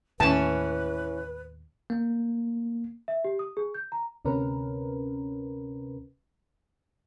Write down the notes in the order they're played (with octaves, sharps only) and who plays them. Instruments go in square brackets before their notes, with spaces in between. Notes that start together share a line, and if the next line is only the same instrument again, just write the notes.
[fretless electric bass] D#2 A2 [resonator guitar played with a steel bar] E3 C#4 [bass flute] B4 [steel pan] A5
[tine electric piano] A#3
[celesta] E5
G4
D#6
G#4
G6
A#5
[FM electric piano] D2 C3 C#4 A#4 B4